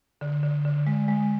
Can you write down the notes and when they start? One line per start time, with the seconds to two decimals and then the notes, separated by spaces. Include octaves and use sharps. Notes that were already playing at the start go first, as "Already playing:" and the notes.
0.21 D3
0.43 D3
0.65 D3
0.87 G#3
1.08 G#3